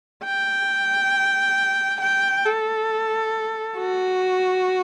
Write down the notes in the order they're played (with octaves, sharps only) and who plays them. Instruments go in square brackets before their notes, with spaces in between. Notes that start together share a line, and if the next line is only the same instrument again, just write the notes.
[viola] G5
G5
A4
F#4